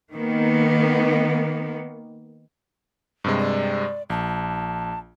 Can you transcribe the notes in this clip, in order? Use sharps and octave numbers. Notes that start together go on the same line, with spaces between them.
D#3 A#3 B3
G2 C3 G#3
D5
A#1 A5